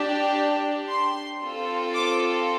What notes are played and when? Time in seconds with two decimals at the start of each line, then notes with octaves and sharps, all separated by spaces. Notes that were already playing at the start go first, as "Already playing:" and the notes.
Already playing: D4 G4
0.89 C6
1.41 C4 F4 A4
1.94 D6